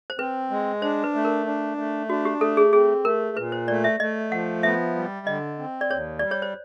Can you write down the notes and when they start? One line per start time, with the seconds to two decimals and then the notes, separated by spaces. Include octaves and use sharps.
0.10 C5
0.19 C4 B4
0.51 G#3
0.82 D4 C5
1.04 B4
1.14 A3
1.25 A#4
1.46 D4
1.77 A3
2.10 D4 F#4
2.25 G4
2.41 A3 A4
2.57 G#4
2.73 C4 G#4
3.04 A3 A#4
3.37 A#2 B4
3.52 C5
3.68 A3 D5
3.84 E5
4.00 A3 D#5
4.31 F3 F#5
4.63 B3 E5
4.96 G3
5.27 D3 D#5
5.59 C4
5.81 D5
5.90 D#2 C#5
6.19 G3 D5
6.31 C#5
6.42 C5